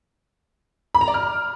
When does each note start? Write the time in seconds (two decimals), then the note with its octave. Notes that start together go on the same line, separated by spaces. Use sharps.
0.95 B5
1.01 A#5
1.08 D5
1.14 F6